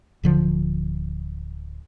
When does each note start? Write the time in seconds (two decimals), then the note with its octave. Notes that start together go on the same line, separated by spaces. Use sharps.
0.23 D1 D3 F3